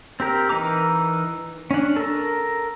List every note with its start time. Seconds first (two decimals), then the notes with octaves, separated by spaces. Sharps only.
0.20 C4 G4 A#4
0.49 E3 D#4 A#4 A#5 D6
1.71 C#4 D4
1.96 A4 A#4